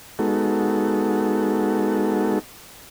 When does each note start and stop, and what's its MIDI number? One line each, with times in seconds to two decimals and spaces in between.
0.19 2.39 56
0.19 2.39 59
0.19 2.39 63
0.19 2.39 66
0.19 2.39 69